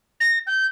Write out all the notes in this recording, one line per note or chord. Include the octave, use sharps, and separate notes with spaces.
A#6
G6